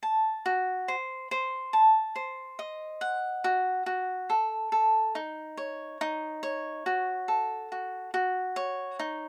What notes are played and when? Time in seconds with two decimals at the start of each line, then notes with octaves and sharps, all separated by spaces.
0.03 A5
0.46 F#4
0.88 C5
1.31 C5
1.73 A5
2.16 C5
2.59 D#5
3.01 F#5
3.44 F#4
3.86 F#4
4.30 A4
4.72 A4
5.15 D#4
5.57 C#5
6.01 D#4
6.43 C#5
6.86 F#4
7.28 A4
7.72 F#4
8.14 F#4
8.56 C#5
8.99 D#4